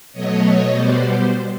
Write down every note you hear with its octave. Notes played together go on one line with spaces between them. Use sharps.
B2 F#3 A3 C#5 D#5
C#5 D#5
B2 G3 B3 C5 D5
C5